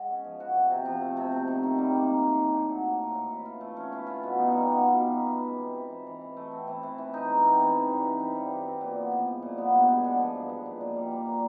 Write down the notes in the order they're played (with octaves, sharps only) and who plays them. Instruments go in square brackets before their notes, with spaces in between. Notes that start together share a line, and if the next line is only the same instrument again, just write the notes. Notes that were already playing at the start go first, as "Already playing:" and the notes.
Already playing: [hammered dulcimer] G#3 F#4
C#4
F3
F#4
C3
C3
F3
A3
C3
C3
D#3
D#3
G3
A#3
D#3
D#3
A2
A2
F#3
A#3
A2
A2
E3
F4
A3
C#4
E3
F4
B2
D#4
G3
B3
B2
D#4
E3
E3
G#3
C4
E3
E3
E3
E3
A3
C4
E3
E3
E3
D#4
G#3
C4
E3
D#4
G2
C4
E3
G3
G2
C4
A#2
B3
F3
G#3
A#2
B3
G2
G#3
D3
F3
G2
G#3
A#2
A#2
G3
A#3
A#2